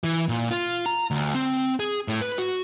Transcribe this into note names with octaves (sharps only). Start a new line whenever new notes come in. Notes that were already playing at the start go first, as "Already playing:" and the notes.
E3
A#2
F4
A#5
D2
C4
G#4
A2
B4
F#4